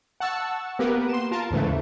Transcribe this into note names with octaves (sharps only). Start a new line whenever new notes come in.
F#5 A5 C#6 E6
A#3 B3 G4 A#4 B4
C6 E7
F4 A#4 A5
D#2 G#2 C#3 E3 A3